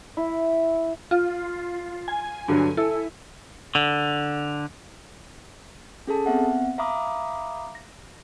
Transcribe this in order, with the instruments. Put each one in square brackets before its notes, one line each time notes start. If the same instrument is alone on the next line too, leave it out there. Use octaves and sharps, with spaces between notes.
[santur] E4
[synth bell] F4
G#5
[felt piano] G2 D3 F#3
[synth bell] E4 [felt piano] A4
[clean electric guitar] D3
[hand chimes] C#4 G#4 A4 A5
B3 C4 E5 F#5
E5 F5 A#5 B5 D6 D#6
A#6